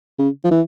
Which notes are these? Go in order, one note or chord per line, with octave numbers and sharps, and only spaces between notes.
C#3
F3
E3